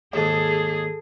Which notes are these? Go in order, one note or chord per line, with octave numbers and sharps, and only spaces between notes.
D#2 G#2 G#4 A4